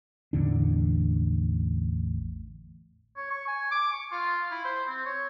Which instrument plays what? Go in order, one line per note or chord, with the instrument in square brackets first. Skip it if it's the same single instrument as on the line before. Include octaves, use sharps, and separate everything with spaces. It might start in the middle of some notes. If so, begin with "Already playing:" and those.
[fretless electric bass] A1 E2 D3 D4
[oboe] C#5
C#6
G#5
D6
C#6
F4
E4
C5
C4
C#5